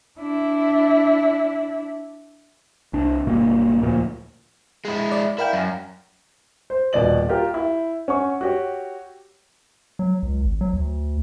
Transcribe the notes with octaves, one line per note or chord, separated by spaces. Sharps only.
D4 E4
C2 D4
G1 B2 A#3
D2 A#2 F3
G#3 E4
D5
E4 A#4 F5 G5
F#2
C5
D#1 B2 D5 F#7
F4 G4 A#4
E4
C#4 F#5 C#6
F#4 G4 C#5
F#3
C#2
G#1
F#3
D2